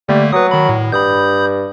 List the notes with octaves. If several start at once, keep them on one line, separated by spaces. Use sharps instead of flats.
D3 G3 A3 A#3
F#3 B4 D#6
D#3 B5
A2
G2 B5 D#6 G6